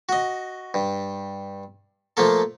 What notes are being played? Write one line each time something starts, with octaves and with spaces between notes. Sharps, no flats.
F#4 D#5
G2
F3 A3 A#3 A4